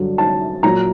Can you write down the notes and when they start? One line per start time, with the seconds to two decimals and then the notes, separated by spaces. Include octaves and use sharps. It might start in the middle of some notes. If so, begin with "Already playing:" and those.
Already playing: G2 D3 F#3
0.18 A5
0.63 A#2 F#3 A#5